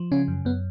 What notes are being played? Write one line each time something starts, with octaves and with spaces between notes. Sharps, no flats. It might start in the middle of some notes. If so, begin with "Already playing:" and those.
Already playing: F3
C#3 C#4
F#2
F#2 B3